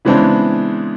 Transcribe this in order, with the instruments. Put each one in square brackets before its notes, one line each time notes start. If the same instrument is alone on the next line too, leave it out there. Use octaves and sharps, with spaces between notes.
[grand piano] C#3 E3 G#3 B3 C4 D4